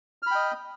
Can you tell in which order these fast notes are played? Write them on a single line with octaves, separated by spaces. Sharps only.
F6 B5 G5 D#5